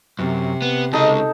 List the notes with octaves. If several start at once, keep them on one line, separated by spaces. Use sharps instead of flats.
F#2 C3
B3
C#2 D#4 A4 D#5